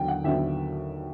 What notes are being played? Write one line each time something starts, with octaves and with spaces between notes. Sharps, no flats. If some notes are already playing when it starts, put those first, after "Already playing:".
Already playing: D#2 D3 F#3 B3 G5
F#5
D#2 D3 F#3 B3 E5